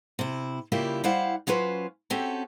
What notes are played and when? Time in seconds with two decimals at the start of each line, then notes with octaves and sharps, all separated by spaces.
0.19 C3 E4
0.72 C#3 G3 A#3 E4 F4 G4
1.04 G3 E4 C5 F5 F#5
1.47 F#3 C#4 F4 B4 C5
2.10 C4 C#4 F#4 G4 A4